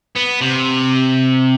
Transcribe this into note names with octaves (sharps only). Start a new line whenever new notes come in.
B3
C3